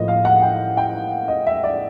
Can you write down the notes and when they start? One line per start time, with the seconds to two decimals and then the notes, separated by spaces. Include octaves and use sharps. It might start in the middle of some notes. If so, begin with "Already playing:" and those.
Already playing: A2 F3 A#3 D#5
0.08 F5
0.25 F#5
0.42 G5
0.77 G5
1.28 D#5
1.46 E5
1.63 D5